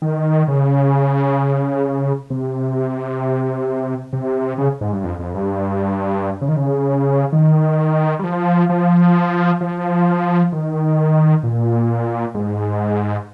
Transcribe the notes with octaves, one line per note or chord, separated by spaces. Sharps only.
D#3
C#3
C3
C3
C#3
G#2
G2
F2
F2
G2
C#3
D#3
C#3
D#3
G3
F3
F3
F3
D#3
A#2
G#2